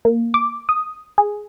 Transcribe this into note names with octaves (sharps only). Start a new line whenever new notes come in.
A#3
D6
D#6
G#4